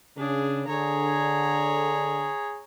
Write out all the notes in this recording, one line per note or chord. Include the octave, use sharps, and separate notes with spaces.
C#3 D4 G#4
D3 G#4 C#5 A#5